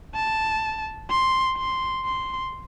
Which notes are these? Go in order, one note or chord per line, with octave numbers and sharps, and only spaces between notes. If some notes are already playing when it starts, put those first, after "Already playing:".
A5
C6
C6
C6